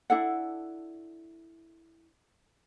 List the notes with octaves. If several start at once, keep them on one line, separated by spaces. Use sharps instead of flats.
D4 E4 A4 F#5